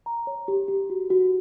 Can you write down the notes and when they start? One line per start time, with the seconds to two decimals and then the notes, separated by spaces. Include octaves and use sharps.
0.06 A#5
0.27 C#5
0.48 G4
0.68 G4
0.90 F#4
1.10 F#4